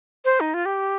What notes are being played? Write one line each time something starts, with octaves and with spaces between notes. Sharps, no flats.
C5
D#4
F4
G4